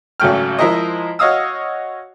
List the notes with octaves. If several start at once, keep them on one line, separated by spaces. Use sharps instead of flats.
G#1 C#3 F#3 A3 G5 F6
F3 G#3 E4 A#4 C5 D#5
F#4 C#5 D#5 F5 D#6 E6